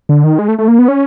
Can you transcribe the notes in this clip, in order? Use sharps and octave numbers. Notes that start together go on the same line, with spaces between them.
D3
D#3
G#3
A3
A3
A#3
B3
C#4